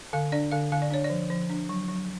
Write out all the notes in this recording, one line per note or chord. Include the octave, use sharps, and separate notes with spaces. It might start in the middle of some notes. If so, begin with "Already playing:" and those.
D3 F5
D4 D5
D3 F5
D3 F5
D5
D4 C#5
D5
F3
F3
D4
F#3
F#3